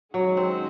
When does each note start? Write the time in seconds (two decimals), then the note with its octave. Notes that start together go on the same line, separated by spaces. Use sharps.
0.14 D#3 F#3 G#3 C#4 F#4
0.37 C4